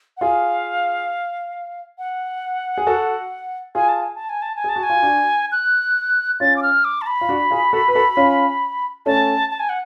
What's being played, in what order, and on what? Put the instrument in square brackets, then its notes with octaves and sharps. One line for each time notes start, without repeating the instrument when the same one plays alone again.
[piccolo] F#5
[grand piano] F4 G#4 [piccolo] F5
[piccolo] F#5
[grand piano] G#4
F#4 A4
[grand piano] F4 G#4 [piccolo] G#5
[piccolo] A5
G#5
A5
G#5
A5
G#5
[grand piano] G#4 [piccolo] A5
[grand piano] F#4
[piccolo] G#5
[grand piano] F4
D4 F#4
[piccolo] F#6
[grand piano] C#4 F4 [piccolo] A6
[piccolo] D6
F6
D6
A5
B5
[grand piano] F4
D4 F#4
F4 G#4
F#4 A4
B4
F#4 A4
C#4 F4
[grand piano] A3 C#4 [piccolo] A5
[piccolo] A5
G#5
F#5